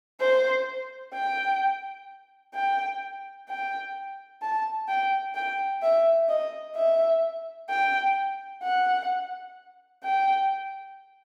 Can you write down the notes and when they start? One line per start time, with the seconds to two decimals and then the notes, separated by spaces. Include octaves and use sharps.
0.20 C5
1.13 G5
2.54 G5
3.48 G5
4.42 A5
4.88 G5
5.35 G5
5.82 E5
6.29 D#5
6.76 E5
7.70 G5
8.63 F#5
10.04 G5